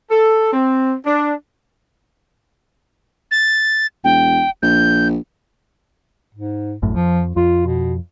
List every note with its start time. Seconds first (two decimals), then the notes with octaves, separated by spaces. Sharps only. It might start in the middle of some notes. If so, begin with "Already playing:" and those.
0.11 A4
0.53 C4
1.06 D4
3.31 A6
4.04 E1 G5
4.62 A#1 G6
6.35 G#2
6.82 G#1 F#2 A2
6.94 F2 F3
7.36 F2 F4
7.66 B2